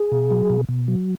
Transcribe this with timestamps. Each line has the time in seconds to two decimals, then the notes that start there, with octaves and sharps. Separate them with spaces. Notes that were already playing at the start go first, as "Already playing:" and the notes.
Already playing: G#4
0.12 B2
0.31 F#3
0.50 B2
0.69 B2
0.88 F#3